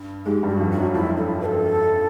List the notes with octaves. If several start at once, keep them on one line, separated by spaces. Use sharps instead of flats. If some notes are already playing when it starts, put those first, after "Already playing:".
Already playing: G2
G#2 G#3 G4
G2 G3
F#4
F2 F3
F#4
F#2 F#3
F2 F3 E4
A4
B4
A4